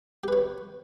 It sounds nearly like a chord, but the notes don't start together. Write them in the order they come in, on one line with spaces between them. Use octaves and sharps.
G4 B4 C#5